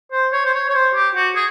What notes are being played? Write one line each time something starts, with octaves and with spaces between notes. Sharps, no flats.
C5
C#5
C5
C#5
C#5
C5
G4
F#4
G#4